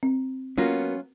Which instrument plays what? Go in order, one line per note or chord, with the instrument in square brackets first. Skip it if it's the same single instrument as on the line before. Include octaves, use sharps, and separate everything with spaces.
[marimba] C4
[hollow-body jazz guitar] F#3 A#3 B3 [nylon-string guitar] C#4 F4